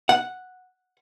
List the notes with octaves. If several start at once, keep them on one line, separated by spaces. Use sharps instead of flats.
F#5